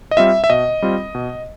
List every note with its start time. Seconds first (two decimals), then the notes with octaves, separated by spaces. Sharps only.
0.11 D#5
0.17 G3 C4 F4 E5
0.44 E5
0.50 B2 D#5
0.82 G3 C4 F4
1.15 B2